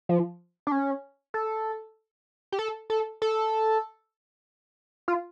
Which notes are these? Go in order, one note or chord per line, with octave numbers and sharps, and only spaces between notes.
F3
D4
C#4
A4
G4
A4
A4
A4
F4